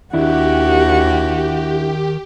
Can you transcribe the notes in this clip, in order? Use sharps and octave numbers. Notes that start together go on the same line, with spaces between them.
D#2 D#3 D4 E4 F#4 G4